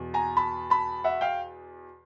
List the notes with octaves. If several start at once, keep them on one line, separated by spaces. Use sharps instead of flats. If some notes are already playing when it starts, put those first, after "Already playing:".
Already playing: E2 B2
G#5 A#5
A5 B5
A5 B5
E5 F#5
F5 G5